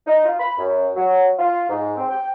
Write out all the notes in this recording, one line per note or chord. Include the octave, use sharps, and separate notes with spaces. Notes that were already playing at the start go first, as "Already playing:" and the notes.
D#4
F4
B5
F#2
F#3
F4
G#2
C4
G5